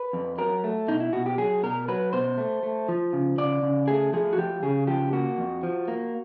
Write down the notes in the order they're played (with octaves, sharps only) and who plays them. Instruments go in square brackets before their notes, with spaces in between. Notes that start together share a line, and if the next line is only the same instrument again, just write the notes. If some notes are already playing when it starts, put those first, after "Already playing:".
Already playing: [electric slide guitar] B4
F2
F#3 A#4
A3
B2 D#4
E4
B2 F#4
G4
F#3 G#4
B2 A#4
F#3 B4
B2 C5
A3
A3
F3
C#3
C#3 D5
C#3
A3 G#4
F3 G#4
F#4
F3 G4
C#3 G#4
F3 G4
A#3 F#4
F2
F3
A#3